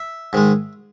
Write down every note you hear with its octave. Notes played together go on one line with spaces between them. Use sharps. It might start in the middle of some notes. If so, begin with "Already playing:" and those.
Already playing: E5
G#2 D#3 G#3